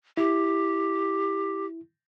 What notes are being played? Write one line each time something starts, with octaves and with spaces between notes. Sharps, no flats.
E4 G4